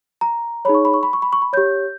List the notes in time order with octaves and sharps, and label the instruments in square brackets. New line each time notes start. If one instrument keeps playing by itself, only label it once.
[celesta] A#5
D#4 G#4 C#5 B5
C#6
B5
C#6
B5
C#6
B5
C#6
B5
G4 C#5 G6